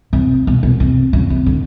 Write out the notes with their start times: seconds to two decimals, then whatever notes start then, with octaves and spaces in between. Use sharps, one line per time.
0.13 C3
0.47 B2
0.63 B2
0.80 C3
1.13 C#3
1.30 C3
1.46 D3